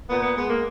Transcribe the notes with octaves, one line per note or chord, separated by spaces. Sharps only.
A#2 B3
B3
G#3 B3
A#3